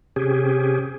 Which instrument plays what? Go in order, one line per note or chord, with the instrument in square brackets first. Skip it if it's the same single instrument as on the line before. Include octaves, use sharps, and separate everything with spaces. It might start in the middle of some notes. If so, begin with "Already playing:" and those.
[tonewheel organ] C3 C#4 G4 G#4